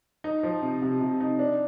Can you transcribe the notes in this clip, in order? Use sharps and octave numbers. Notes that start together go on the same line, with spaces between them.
D#4
F3
C3
C3
C3
D#4
D4